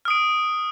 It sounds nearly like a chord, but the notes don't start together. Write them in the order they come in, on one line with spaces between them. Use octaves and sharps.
F6 D#6 D7